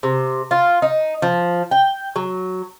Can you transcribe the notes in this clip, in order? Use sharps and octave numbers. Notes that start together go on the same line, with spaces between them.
C3
F4
D#4
F3
G5
F#3